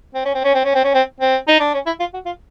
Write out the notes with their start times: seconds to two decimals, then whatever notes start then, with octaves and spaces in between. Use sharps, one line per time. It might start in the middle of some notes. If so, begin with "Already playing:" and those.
0.14 C4
0.25 C#4
0.35 C4
0.44 C#4
0.54 C4
0.64 C#4
0.75 C4
0.84 C#4
0.94 C4
1.20 C4
1.48 D#4
1.60 D4
1.74 C#4
1.86 E4
2.00 F4
2.13 F#4
2.25 F4